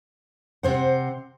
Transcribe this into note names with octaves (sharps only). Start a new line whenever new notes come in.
C3 C5 F#5